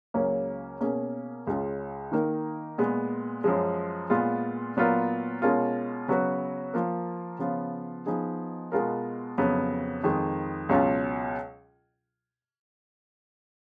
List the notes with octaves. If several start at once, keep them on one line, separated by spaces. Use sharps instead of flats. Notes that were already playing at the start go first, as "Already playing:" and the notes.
C#2 C#3 F#3 A#3 C#4
B2 A#3 C#4 G#4
C#2 C#3 G#3 C#4 F4
D#3 A#3 D#4 A#4
A#2 G#3 B3
F#2 F3 G#3
A#2 G#3 B3 F4
A#2 F#3 B3 F4 A#4
B2 G#3 C#4 F4 A#4
C#3 F#3 B3 F#4 B4
F3 A#3 F4 A#4
C#3 F3 B3 F4
F3 B3 D#4 G#4
B2 G#3 B3 F4 A#4
F2 C#3 F#3 B3
F2 D#3 G#3
C#2 B2 F#3 C#4 F4